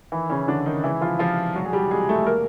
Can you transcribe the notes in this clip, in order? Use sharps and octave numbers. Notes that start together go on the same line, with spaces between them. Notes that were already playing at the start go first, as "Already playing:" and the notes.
D#3 E3 E4
C#3 C#4
D3 D#3 D4
D#3 D#4
C#2 E3 E4
F3 F4
C3 F3 F4
E1 F#3 F#4
G#4
G3 G4
C3 G#3 G#4
A3 A4
A#3 A#4